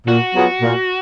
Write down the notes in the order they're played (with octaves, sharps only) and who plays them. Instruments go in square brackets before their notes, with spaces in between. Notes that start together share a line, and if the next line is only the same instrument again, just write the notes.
[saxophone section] A#2 [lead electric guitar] F#4
[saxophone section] F#3 B3 F4 G#4
A#2